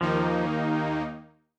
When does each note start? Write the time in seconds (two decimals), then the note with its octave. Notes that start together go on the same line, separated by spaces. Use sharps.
0.01 D#2 D#3 F3 A#3 D#4